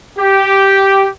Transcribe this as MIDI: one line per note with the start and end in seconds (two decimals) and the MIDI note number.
0.18 1.08 67